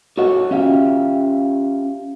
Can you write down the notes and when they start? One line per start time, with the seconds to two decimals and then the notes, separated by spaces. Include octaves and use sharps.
0.18 F#4 A4 C#5 D#5 F#5
0.51 C#4 F4 G4 E5 F5